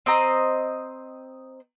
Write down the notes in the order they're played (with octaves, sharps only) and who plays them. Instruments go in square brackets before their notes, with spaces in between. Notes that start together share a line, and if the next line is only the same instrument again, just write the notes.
[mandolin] C4 C5 D#5 A#5